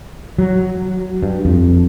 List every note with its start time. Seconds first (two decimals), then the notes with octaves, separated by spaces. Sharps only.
0.38 F#3
1.23 G2
1.45 F2